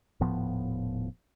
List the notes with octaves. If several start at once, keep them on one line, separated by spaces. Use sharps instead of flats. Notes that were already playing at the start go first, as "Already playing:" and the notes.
D#1 A2 F3 B3